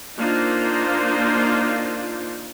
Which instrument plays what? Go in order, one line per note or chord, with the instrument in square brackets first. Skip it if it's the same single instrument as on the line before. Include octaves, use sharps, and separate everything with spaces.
[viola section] A#3 D4 D#4 F4 C5